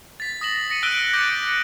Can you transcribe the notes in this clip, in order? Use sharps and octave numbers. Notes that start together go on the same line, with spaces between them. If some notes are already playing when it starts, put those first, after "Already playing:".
A6 B6
D#6 A#6 E7 F#7
A#6 C#7 D#7
E6 F#6 D7 D#7 G7
D6 G6 A6 A#6 C#7 D7